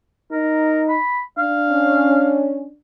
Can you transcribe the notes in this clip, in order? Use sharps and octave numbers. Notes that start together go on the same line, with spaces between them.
D#4 A#4
B5
D4 F5
C#4